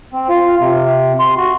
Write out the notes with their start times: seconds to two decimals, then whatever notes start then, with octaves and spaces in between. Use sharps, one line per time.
0.13 C4
0.29 F4
0.60 C3
1.19 C6
1.37 F#4